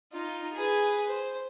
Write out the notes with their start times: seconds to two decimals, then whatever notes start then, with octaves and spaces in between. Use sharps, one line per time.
0.12 D#4 F4
0.54 G#4 B4
1.08 C5